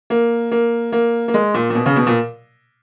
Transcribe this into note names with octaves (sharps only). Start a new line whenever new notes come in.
A#3
A#3
A#3
A#3
G#3
A#2
A#2
B2
C#3
B2
A#2